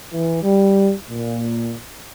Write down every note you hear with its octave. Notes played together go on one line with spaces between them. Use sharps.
E3
G3
A#2